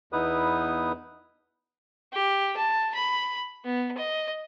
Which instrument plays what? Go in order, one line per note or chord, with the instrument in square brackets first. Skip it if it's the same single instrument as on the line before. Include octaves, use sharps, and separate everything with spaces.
[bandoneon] E2 B3 D#4 E4 B4 D#6
[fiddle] G4
A5
B5
B3
D#5